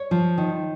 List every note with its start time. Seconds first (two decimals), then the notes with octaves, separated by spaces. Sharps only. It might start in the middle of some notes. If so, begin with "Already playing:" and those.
Already playing: C#5
0.11 F3
0.38 D#3